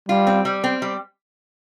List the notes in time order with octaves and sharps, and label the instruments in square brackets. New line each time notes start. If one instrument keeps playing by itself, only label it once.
[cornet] G3 [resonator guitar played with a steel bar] F4
[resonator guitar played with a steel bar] C4
G3
C4
G3